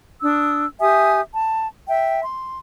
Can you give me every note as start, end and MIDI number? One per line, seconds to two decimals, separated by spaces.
0.22 0.65 62
0.22 0.65 87
0.22 0.65 88
0.79 1.21 67
0.79 1.21 76
0.79 1.21 80
0.79 1.21 87
1.33 1.66 81
1.87 2.22 76
1.87 2.22 79
2.23 2.59 84